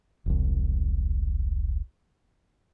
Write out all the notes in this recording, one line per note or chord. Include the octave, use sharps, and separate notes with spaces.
E1 C2